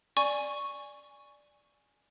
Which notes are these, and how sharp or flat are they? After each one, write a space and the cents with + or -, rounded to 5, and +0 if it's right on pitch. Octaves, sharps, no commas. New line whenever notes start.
D5 +0 G#5 +0 C#6 +0